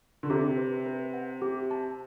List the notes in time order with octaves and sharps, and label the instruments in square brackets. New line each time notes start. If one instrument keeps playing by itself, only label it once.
[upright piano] D3
[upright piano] C3 [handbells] G4
[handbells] B4
B4
F#5
G4
A5